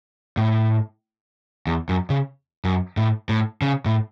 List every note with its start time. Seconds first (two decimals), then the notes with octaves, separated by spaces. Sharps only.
0.37 A2
1.67 E2
1.89 F#2
2.10 C#3
2.65 F#2
2.97 A2
3.29 A2
3.62 C#3
3.86 A2